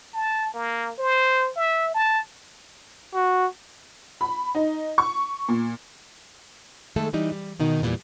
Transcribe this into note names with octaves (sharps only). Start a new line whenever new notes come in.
A5
A#3
C5
E5
A5
F#4
B5
D#4
C#6
A#2
D#3 G#3 A3 A4
E3 G3 D#4
G3
B2 D#3 D#4
E2 A#2 E3 G3